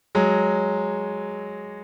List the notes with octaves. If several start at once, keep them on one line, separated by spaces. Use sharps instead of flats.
F#3 G#3